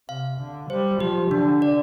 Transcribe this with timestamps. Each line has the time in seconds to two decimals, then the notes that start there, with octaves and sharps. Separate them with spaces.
0.09 C3 F5
0.39 D3
0.70 G3 C5
1.00 F3 G4
1.31 D3 D4
1.62 D5